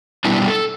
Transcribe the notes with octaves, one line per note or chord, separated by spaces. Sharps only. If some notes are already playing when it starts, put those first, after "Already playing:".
B2 G3 B3 D4 E4
A4